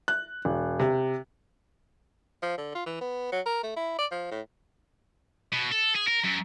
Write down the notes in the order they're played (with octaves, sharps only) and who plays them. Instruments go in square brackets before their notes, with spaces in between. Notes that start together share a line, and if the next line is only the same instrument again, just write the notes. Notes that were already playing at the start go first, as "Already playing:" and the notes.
[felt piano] F#6
E1
C3
[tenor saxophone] F3
D3
F4
E3
B3
F#3
A#4
A3
E4
D5
F3
A2
[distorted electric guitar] B2
A4
G#4
A#4
F#2